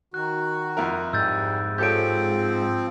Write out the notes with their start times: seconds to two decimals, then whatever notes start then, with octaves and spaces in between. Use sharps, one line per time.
0.14 D#3 F#4 F#6
0.77 F2 E4 A#4
1.13 G#2 G3 E6 G6 A6
1.78 F3 C4 G4 A4 C#5 G6 D7